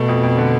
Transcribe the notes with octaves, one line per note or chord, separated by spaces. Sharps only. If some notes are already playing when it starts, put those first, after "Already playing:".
Already playing: B2 A3
F2
F2
D3